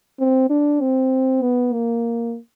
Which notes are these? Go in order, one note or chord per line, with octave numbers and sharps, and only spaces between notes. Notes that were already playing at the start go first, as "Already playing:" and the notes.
C4
D4
C4
B3
A#3